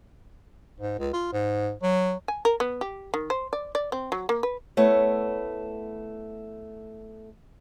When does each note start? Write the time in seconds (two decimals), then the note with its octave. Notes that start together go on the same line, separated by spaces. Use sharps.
0.80 G#2
0.99 C#2
1.13 F4
1.32 G#2
1.83 F#3
2.28 G#5
2.45 A#4
2.60 B3
2.81 G4
3.14 D#3
3.30 C5
3.53 D5
3.75 D5
3.92 C4
4.12 F#3
4.29 A#3
4.43 B4
4.77 A3 B3 E4 C#5